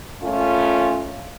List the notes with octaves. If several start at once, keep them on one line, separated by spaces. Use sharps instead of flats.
A#2 A3 C#4 F4